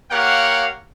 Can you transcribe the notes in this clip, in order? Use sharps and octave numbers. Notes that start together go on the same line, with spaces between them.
A#3 G4 A#4 C#5 F5 F#5